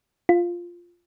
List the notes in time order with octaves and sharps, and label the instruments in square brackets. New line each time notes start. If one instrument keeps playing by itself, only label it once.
[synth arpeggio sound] F4